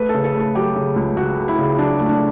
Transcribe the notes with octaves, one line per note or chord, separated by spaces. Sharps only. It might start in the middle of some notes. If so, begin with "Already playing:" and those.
Already playing: A3 B4
A4
C#3
A4
A3
A4
F#3 G4
C#3
C#2
C#3 F#4
A3
E4
C#3
F#3 D4
A3
D4